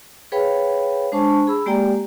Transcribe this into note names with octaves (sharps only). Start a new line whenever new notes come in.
G#4 B4 C#5 F5 G5 B5
G#3 D4 C5 A5 C#6
G#4 B5 E6
G#3 A#3 G4 D5 G5 A#5